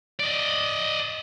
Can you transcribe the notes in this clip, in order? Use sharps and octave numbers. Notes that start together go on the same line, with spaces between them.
D5 D#5